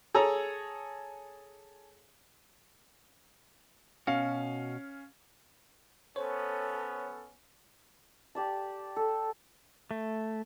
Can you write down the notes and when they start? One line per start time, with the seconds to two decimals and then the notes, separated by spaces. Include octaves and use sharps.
0.14 G#4 A4 C#5 A#5
4.07 B2 C#4 F#4 F5
6.16 B3 C#4 A4 C5 C#5
8.35 G4 D5 A5
8.96 A4
9.91 A3